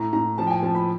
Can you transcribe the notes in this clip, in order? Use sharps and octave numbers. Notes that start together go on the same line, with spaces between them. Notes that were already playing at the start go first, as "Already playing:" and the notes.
Already playing: A2 A#5
A2 A#5
F3 A5
G5
G#5
F3 A5
B5